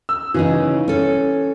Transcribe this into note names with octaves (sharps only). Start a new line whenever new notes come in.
E6
C#3 E3 C#4 D#4
C#4 A4